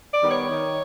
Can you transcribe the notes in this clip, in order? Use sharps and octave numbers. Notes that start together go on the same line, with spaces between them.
D5
D#3 G3 B3
C#5
D#3